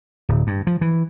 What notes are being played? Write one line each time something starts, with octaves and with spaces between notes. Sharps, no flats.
D1
G2
F3
E3